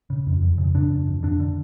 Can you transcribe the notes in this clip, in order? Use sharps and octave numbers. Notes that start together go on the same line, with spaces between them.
C#3
F2
F2
C#3
C#3 D4
F2
F2
D3 D4
D3